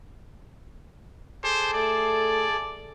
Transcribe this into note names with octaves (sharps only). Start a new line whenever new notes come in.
G#4 A4 C5 D6
A3 D5